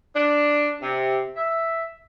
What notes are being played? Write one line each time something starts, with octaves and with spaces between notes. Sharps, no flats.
D4
C3
E5